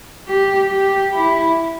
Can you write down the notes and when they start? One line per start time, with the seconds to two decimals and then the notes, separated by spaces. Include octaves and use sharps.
0.28 G4
0.71 G4
1.13 E4